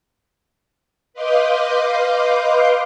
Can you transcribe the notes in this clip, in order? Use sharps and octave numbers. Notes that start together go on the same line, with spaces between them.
B4 D#5 F5 C6 D6 G6